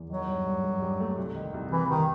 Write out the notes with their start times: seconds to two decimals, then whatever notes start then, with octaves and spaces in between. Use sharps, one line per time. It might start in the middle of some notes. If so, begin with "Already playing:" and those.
Already playing: E2
0.10 D#3 F#3
0.27 G2
0.46 G2
0.64 G2
0.82 G2
1.00 A3
1.17 C2
1.35 D#3
1.54 C2
1.71 C3 E3
1.89 C2 D#3